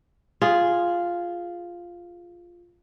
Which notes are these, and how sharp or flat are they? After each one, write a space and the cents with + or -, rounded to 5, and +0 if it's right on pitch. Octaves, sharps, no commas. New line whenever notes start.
F4 +0 G#4 +0